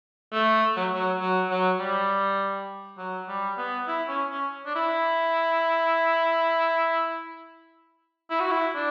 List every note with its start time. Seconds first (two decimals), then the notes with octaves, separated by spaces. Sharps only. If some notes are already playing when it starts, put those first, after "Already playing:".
0.32 A3
0.77 F#3
0.94 F#3
1.20 F#3
1.50 F#3
1.80 G3
2.98 F#3
3.28 G3
3.57 B3
3.87 E4
4.08 C#4
4.31 C#4
4.66 D4
4.75 E4
8.30 E4
8.40 F#4
8.51 E4
8.75 D4